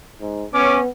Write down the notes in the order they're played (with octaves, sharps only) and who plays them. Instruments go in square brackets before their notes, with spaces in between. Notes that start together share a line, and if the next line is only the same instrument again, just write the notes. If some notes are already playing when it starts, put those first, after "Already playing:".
[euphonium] G#2
[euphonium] B3 [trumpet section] C#4 [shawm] D6